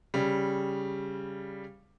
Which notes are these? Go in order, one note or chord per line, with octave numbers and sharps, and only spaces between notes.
C#3 G3